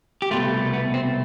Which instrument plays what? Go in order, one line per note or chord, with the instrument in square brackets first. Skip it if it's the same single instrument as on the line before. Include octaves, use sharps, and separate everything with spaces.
[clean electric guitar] G4
C2 B2 A3 F4
B3
C4